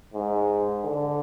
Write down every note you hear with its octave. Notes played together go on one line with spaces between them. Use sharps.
G#2
D3